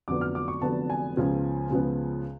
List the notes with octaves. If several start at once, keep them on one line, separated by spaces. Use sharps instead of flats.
F1 F2 D3 F#3 B3 D6
F6
D6
C#6
F1 F2 D3 F#3 B3 A5
G#5
C#2 C#3 F3 B3
C#2 C#3 F3 B3